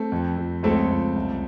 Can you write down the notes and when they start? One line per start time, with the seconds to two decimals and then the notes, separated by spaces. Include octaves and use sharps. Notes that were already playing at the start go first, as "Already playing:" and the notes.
Already playing: A3 C4
0.12 F2
0.37 F2
0.63 C#2 A3 C4
0.90 C#2
1.16 C2